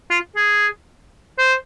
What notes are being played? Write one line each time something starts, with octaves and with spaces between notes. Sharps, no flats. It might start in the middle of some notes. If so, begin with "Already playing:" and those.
F4
G#4
C5